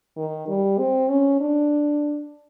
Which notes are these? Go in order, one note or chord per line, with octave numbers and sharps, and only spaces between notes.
D#3
G3
C4
C#4
D4